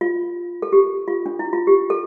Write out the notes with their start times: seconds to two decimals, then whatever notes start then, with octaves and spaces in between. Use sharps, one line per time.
0.01 F4
0.62 A4
0.72 G4
1.08 F4
1.26 D4
1.39 E4
1.53 F4
1.67 G4
1.90 A4